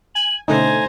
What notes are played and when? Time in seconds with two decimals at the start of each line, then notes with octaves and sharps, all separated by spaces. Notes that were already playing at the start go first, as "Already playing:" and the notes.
0.15 G#5 F#7
0.48 B2 D3 A3 C#4 D#4 C5 G#5 A#5